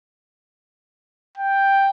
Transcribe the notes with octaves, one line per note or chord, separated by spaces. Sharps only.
G5